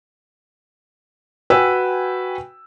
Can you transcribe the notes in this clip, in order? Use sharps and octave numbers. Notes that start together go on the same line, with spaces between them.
F#4 B4 G5 G#5 E6